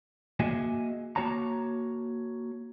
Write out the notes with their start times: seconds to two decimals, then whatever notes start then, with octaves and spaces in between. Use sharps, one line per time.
0.40 A#3 F#4 G#4 D#5 E5 G#5
1.16 A#3 F#4 C#5 A5 A#5